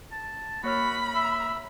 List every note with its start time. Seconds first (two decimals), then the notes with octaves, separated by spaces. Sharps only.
0.12 A5
0.64 A#3 F#4 C#5 B5 F6
1.15 E5